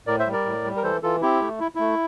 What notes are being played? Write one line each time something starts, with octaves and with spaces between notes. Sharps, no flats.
A2 A#4 D5
C5 E5
G3
A#4 D5
A2
G3
A#4
E3 A4 C5
E3 F4 A4
C4 E4 G4
A3
E4
A3 E4